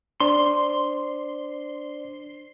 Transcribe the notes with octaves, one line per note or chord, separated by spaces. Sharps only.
D4 C5 D5 C6